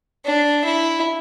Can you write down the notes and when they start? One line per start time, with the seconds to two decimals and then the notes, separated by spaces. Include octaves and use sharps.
0.25 D4
0.65 E4